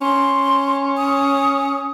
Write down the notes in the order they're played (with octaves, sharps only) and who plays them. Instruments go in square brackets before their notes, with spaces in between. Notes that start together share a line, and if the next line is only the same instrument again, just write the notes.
[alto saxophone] C#4 [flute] C6
[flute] D#6